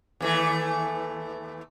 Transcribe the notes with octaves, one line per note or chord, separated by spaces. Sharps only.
D#2 E3 A3